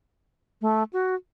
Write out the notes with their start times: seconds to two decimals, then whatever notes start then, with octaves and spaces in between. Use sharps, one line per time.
0.61 A3
0.93 F#4